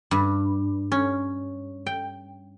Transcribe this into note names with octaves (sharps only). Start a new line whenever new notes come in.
G2
C#4
G5